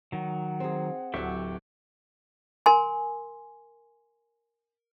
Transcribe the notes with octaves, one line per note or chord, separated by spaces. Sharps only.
D#3 F#3 F#5
C4 G#4
D1 F#3 G4 A4 E5 C#6
A#4 G#5 C6